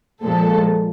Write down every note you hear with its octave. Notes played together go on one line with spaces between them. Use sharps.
A#2 F3 G#3 A4